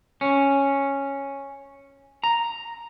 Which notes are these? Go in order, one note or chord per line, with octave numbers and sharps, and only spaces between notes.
C#4
A#5